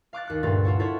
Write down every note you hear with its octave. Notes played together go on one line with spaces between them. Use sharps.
F5 D6 F#6 A6
D#2 F#6 C#7
D2 G2 A#2 F4 A6
F4 A4 C#5 F#5
E4 F4 A4 C#5 F#5